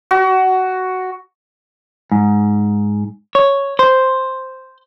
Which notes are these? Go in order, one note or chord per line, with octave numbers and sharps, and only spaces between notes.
F#4
G#2
C#5
C5